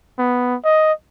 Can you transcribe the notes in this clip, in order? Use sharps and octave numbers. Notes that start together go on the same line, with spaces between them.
B3
D#5